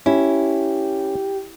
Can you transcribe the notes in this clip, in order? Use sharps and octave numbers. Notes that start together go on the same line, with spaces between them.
C#4 E4 G4